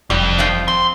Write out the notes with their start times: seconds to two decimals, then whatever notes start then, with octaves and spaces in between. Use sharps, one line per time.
0.10 F1 F2 G3
0.39 F3 F4 G5
0.68 C4 C6